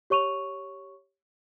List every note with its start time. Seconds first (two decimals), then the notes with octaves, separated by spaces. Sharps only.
0.10 G4 C#5 C#6 D#7 F7